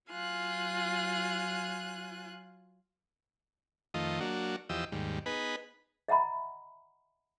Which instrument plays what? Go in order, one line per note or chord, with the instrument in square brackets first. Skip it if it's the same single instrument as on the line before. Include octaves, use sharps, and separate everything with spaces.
[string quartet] F#3 F4 G#5 F#6
[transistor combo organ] F2 D#3 A3 F4 D#5
F#3 A#3 D4 F#4
E2 F3 G4 D#5 E6
D#2 G#2 G3
B3 D#4 G#4 B4
[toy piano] D#5 E5 F#5 A#5 B5